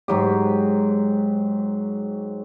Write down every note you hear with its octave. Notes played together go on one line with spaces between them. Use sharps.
G#2 F#3 G4